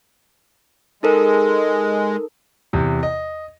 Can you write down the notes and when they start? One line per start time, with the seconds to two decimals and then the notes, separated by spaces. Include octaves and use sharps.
1.03 G#3 D#4 A4 A#4
2.73 E2 C3
3.03 D#5